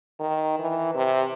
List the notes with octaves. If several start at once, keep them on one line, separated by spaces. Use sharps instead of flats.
D#3
E3
C3